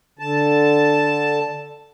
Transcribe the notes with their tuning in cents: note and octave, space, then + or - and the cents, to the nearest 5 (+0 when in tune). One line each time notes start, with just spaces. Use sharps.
D3 +0 A5 +0